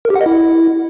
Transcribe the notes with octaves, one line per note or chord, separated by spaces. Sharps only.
A#4
G4
F#5
D#5
E4